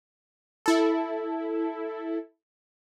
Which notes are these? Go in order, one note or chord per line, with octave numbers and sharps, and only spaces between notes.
E4 A4